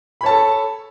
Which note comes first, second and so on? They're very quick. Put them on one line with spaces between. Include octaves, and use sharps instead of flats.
B5 C#5 A5 A4